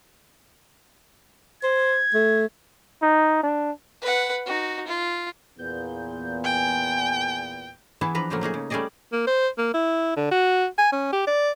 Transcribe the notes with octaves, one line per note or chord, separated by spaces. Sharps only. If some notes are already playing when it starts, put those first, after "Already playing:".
C5 G#6
A3
D#4
D4
B4 F#5
D#4 F#4
F4
E2 A#2 B3 G6
G5 G#5
E3 B3 E4 G#4 E5 A5
F3 D4 B4 A#5
A2 C#3 F3 F#3 A3 A#3
A3 A#3 D#4 G#4
C#3
G3 A3 C#4 G#4 D5 D#5
A#3
C5
A#3
E4
D3
F#4
G#5
C#4
G4
D5